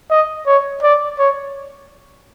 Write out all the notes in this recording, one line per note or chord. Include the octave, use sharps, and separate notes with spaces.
D#5
C#5
D5
C#5